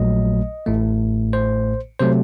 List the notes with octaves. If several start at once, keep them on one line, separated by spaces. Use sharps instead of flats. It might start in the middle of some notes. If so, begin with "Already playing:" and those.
Already playing: A#1 A#2 F#3 A3 D#5
A1 A2 A3
C5
C3 F#3 A3 C5